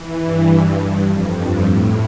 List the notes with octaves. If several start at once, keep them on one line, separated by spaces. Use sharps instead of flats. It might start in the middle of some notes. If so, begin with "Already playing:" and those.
Already playing: E3
G2
F2
G2
A2